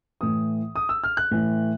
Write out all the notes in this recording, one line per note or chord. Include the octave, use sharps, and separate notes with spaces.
A2 E3 D#6
D#6
E6
F6
F#6
A2 E3